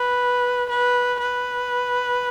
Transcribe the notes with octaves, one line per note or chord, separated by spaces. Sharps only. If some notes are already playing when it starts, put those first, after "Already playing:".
Already playing: B4
B4
B4